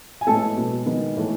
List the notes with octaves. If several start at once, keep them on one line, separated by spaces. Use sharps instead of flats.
G#5
A2 G#3 B3 A4 A5
B2 G#3 B3
D#3 G#3 B3
A2 E3 A3